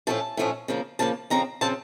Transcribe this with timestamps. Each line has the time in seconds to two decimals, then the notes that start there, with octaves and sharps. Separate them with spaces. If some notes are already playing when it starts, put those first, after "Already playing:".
0.07 A2 F3 A3 C#4 A5
0.37 A2 F3 A3 C#4
0.68 C#3 F3 A#3
0.99 C#3 F3 A#3 A5
1.30 F2 C#3 F3 C4 A#5
1.61 C#3 F3 C4 A5